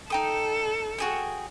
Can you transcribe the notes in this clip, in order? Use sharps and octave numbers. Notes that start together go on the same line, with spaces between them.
D#4 A4 G5 D#6
F#4 G#4 G5